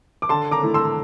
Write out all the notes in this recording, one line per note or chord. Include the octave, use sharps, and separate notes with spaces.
D6
D3 A5 C6
A#5 D6
A3 E4
C6 E6